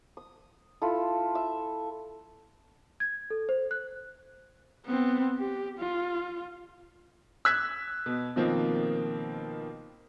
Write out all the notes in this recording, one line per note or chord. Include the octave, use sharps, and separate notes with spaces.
D#6
E4 F4 A4
E5
G#6
A4
C5
F#6
B3 C4
G4
F4
E6 F#6 G#6 B6
B2
B2 D#3 F3 A#3 C4